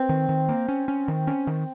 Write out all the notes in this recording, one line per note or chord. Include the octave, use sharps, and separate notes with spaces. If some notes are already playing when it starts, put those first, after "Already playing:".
Already playing: C4
D#3
D#3
A#3
C#4
C#4
D#3
C#4
D#3